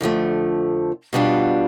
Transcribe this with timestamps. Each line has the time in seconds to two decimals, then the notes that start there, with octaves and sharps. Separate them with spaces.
0.01 F2 D3 F3 A3
1.13 B2 G3 B3 D4 F4